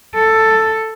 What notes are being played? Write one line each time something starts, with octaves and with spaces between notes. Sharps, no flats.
A4